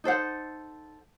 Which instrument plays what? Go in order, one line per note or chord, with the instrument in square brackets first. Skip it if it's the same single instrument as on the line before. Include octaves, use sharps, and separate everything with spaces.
[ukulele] D#4 A4 C5 F#5